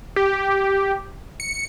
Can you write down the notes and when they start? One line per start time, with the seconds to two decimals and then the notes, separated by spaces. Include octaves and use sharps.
0.16 G4
1.40 C#7